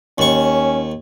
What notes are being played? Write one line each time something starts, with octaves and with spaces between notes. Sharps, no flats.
D#2 C#4 C#6